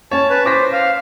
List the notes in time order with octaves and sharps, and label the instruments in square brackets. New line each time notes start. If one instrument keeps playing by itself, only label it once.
[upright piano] C#4 C#5 [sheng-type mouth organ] A5
[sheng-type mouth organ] B4 A5
[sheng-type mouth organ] C5 [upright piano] D6 A#6 B6
[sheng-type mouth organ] F5